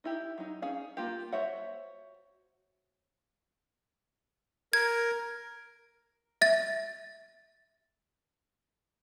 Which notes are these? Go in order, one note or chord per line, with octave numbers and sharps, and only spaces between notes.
D#4 E4 G4
F#3 D#4
C#4 G#4 F5
A#3 F4 G4
F#4 C5 C#5 E5 F#5
A#4 G#6
E5 A6